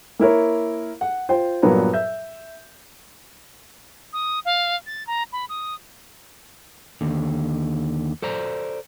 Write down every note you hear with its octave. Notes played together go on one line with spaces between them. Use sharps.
A#3 E4 A#4 C#5
F#5
F4 C5 G5
G2 A#2 F#3 B3 A#4 A#5
E5 G6
D#6
F5
A6
A#5
B5
D#6
D#2 D3
A4 C5 D5 A#5